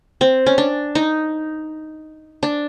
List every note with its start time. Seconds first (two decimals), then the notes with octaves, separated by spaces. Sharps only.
0.21 C4
0.46 C#4
0.58 D4
0.95 D#4
2.43 D4